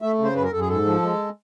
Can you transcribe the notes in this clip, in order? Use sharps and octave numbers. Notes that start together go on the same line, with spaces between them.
A3 E5
C#3
C5
F#2 B4
A#4
F#2 A4
G#4
G#2 A4
F3
G#3